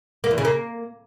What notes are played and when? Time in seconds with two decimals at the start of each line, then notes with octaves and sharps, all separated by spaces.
0.24 A#3
0.31 E2
0.38 C#3
0.45 A#3